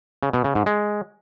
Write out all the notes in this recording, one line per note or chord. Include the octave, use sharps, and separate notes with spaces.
C#3
B2
C#3
G#2
G#3